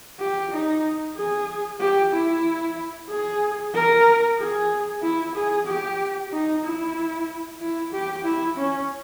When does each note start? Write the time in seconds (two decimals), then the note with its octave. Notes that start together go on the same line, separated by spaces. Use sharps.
0.20 G4
0.51 D#4
1.16 G#4
1.80 G4
2.13 E4
3.09 G#4
3.74 A#4
4.38 G#4
5.02 E4
5.35 G#4
5.67 G4
6.32 D#4
6.64 E4
7.60 E4
7.93 G4
8.25 E4
8.57 C#4